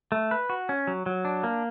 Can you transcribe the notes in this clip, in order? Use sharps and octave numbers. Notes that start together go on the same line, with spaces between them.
A3
B4
F#4
C#4
F#3
F#3
D4
A#3